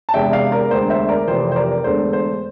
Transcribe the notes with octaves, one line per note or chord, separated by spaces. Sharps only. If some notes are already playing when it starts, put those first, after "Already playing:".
A5
E1 E2 C3 E5 G5
D5 F5
A#4 D5
E1 D2 D3 C5
C5 E5
A#4 D5
F1 F2 C3 E3 C5
C5
A#4 D5
E1 E2 D3 A3 C5
C5